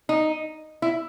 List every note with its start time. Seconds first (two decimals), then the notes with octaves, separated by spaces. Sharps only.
0.09 D#4
0.82 E4